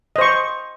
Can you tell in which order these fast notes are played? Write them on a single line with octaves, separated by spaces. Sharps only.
D#5 C5 C#6